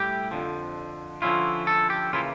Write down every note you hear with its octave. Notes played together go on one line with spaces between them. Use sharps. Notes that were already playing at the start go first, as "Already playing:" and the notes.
Already playing: A2 G3 E4 G4
F2 D3 F3
D3 F3 C#4 E4 F4
A4
G4
C#3 E3 A#3 E4 F4